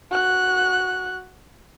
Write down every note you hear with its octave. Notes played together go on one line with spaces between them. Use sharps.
F#4 F#6